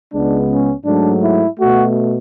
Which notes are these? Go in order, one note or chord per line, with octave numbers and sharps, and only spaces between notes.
C#2 C#3 G#3 B3 D4
C#4
G#2 F#3 A3 D4
E4
B2 A3 F#4